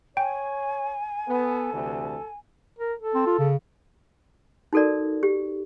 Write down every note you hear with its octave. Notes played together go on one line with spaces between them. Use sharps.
C#5 G5 G#5
B3 A4
D2 C3 E3
A#4
A4
C4
F4
C#3
D#4 F#4 A4 A#4 D5
G4